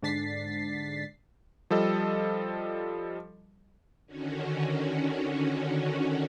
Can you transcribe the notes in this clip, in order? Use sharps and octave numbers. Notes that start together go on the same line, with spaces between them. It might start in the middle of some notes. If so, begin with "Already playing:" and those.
G#2 D3 D4 A6 B6 C7
F3 G3 A4 D#5
D3 D#3 C#4 F#4